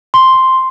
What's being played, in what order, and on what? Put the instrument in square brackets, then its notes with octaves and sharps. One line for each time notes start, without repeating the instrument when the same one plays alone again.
[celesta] C6